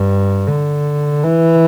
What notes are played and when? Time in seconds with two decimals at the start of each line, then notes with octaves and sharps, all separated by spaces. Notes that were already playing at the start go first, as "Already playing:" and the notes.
Already playing: G2
0.48 D3
1.24 E3